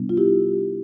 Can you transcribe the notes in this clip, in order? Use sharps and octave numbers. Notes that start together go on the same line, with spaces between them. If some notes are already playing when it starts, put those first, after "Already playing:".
Already playing: C3 G3 B3 D4
F4
E4 G4